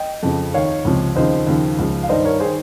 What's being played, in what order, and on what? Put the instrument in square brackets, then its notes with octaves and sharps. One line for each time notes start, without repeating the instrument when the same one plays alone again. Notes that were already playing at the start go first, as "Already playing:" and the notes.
Already playing: [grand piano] D#5 G5
F2 C#3 F3
D#2 D#3 C#5 F5
C#2 C3 F3
D#2 C#3 F3 C5 D#5
D#2 C#3 F3
C#2 C#3 F3
F5
G2 D#3 C5 D#5
A#4 C#5
D#3 G#4 C5